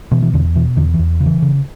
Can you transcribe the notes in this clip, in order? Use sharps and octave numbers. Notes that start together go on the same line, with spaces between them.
B2 E3
E3
E2 D3
B2 E3
E2 D3
E3
E2
C#3
E3
C#3